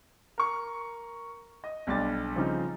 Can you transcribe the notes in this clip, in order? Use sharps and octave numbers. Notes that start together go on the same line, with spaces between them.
A#4 C#6
D#5
B1 G3 D4 A6
C#3 F3 G3 C4 D#4